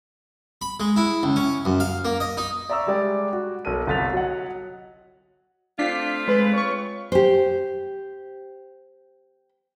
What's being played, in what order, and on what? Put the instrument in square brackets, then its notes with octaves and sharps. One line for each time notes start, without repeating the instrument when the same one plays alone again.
[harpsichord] B5
G#3
E4
C#2
C#4
F#2
F5
A#3
D#5
D#4
[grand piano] D5 E5 A#5 C#6 E6
G3 G#3 G4 D5
F#4
B1 A#4 D#7
G1 C2 A4 A6 B6 F7
F#3 D#5 F#5
[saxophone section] A3 C4 F4 [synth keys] D4 B6 C7
[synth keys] G#3 B4
C#5 C#6
[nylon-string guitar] G4 C5